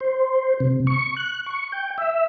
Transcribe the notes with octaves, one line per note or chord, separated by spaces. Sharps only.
C5
C3
C#6
F#6
C#6
G5
E5